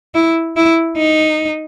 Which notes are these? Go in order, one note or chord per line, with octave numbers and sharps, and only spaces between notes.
E4
E4
D#4